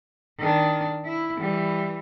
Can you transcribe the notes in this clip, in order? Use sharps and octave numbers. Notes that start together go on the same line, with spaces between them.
D#3 D4
E4
E3 G3